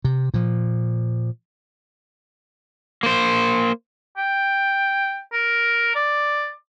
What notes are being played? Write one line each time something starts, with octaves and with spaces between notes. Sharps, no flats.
C3
A#2 F3
A#3 C5
G5
A#4
D5